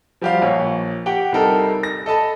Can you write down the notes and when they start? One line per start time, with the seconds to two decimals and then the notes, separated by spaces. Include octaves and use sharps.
0.21 F3 G3 F#4 G4 C5 F5
0.42 A#1 C#5
1.06 G4 F#5 G5
1.32 C2 G3 D#4 A4 A#4
1.83 A#6
2.06 A4 D#5 A5 B5